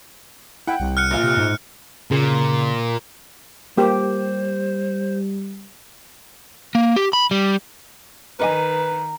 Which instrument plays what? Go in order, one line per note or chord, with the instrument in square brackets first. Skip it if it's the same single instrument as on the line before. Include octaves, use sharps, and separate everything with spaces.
[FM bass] E4 [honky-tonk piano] F#5 G5
[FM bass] C2
[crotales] F6 F#6 C#7
[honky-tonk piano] A#1 A#2 F4
[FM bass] C3
G#2
[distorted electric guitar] A#2 [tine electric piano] C#3
[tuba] G3 [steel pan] A#3 G4 [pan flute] C5
[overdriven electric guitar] A#3
G4
B5
G3
[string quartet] D#3 [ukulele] A#4 D#5 G#5 [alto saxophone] B4 [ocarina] A#5